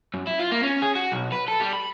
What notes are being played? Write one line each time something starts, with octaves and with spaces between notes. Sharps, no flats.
F#2
E4
F4
A#3
C#4
G#4
F#4
B1
B4
A4
G3
B5